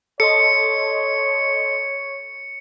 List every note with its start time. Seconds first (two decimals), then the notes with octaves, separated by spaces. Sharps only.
0.20 A4 C#5 D#5 C6 C#7